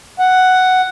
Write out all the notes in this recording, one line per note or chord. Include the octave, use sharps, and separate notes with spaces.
F#5